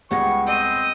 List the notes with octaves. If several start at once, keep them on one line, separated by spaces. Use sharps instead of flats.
C#2 G3 B3 G#4 F#5 C#6 A#6
C4 D#5